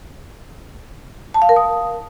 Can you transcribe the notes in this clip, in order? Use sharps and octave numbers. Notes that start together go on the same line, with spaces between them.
A5
F5
A#4
D#6